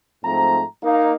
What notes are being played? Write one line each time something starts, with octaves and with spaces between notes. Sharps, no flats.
G#2 F3 A3 C4 A#5
A#3 D#4 F5